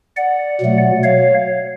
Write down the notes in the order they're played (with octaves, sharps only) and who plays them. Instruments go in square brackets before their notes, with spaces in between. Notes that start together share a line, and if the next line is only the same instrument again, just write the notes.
[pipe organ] D5 F#5
B2 F#3 A3
C#5 F5